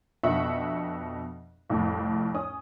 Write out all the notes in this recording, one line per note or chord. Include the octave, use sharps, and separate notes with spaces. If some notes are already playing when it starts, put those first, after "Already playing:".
F2 B2 D4 E5 F#5 C#6
C2 F2 A2
C#4 D#6